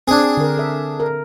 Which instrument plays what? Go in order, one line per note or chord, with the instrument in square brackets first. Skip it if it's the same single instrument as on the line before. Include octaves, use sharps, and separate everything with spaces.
[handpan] C4 [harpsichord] D4 G#4
[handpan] D3 A#4
A4 E5
A#4